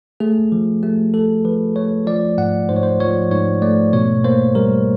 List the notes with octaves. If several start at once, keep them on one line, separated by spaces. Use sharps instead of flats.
A3 G#4
F3
A3 G4
A3 A4
F3 B4
A3 C#5
F3 D5
G#2 F#5
G#2 C5
C#5
C5
F3 C#5
G#2 C#5
A3 D5
B2 C#5
A#3 C5
G3 A#4